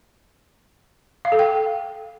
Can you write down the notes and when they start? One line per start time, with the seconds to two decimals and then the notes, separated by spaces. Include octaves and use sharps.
1.25 F5
1.32 A4
1.39 G5